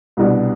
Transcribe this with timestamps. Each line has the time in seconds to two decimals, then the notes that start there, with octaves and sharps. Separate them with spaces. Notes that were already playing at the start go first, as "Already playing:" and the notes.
0.17 C2 B2 G3 B3 D4